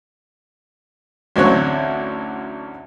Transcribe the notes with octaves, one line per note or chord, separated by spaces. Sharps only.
A1 D2 F#3 C4 C#5 F#6